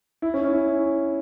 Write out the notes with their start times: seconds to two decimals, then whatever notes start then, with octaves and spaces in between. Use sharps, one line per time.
0.22 E4
0.34 C#4
0.44 C#4
0.53 E4